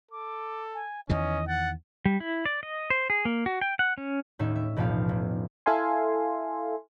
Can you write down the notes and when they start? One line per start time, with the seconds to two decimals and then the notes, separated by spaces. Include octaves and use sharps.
0.11 A4 D6
0.74 G#5
1.09 E2 D#3 E3 C#4 D#5
1.48 F#5 A6
2.05 G3
2.20 E4
2.46 D5
2.63 D#5
2.90 C5
3.10 G#4
3.25 A#3
3.46 F#4
3.61 G5
3.79 F#5
3.98 C#4
4.39 D#2 A2 C#4 D#4 E5
4.56 E5
4.76 F1 B1 A2 F3 G4 F5
5.09 F1
5.66 E4 A4 E5 F5 G#5 C6